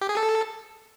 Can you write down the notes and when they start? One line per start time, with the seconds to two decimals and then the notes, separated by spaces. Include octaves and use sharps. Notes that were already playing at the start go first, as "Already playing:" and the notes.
0.01 G4
0.09 G#4
0.17 A4